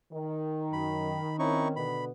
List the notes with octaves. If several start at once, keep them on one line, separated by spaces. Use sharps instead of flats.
D#3
F#2 B5
C4 C#4 D#4 E4 C#6
B2 D3 B3 B5